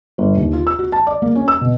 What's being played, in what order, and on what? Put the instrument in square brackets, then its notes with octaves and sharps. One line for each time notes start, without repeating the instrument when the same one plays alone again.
[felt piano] G1
D#2
F4
E6
F#4
A5
D5
A#3
C#4
E6
B2